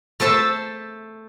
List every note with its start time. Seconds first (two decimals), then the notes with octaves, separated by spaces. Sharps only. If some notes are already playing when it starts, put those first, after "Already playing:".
0.20 A3 A4 C5 E5 A5